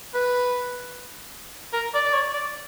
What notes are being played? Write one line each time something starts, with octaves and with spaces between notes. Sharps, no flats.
B4
A#4
D5
D5
C#5
D5